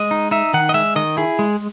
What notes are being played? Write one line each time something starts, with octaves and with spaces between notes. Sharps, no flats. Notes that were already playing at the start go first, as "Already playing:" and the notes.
Already playing: G#3 D#5
D#4
D#4 E5
D#3 F#5
D#5
G#3 E5
D#3 D#5
E4 G#4
G#3